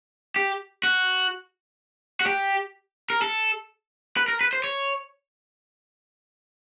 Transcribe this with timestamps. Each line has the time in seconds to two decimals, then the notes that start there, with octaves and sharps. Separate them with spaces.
0.36 G4
0.83 F#4
2.21 F#4
2.27 G4
3.10 A#4
3.22 A4
4.17 B4
4.28 A#4
4.41 B4
4.53 C5
4.64 C#5